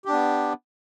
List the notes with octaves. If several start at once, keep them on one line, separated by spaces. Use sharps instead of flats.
B3 D4 G4